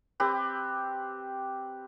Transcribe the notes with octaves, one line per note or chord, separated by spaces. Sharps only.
C4 G4 B4